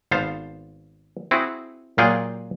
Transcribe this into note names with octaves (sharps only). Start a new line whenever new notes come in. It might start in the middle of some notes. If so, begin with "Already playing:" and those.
G#1 B3 C5 F5 A5
C4 E4 F#4 G#4
A#2 F#3 F4 G#4 F#5 G5